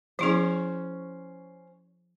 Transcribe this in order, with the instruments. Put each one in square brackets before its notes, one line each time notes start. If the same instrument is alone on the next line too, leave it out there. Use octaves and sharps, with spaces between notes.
[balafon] F3 E4 G#4 [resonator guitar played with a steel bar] C#4 C5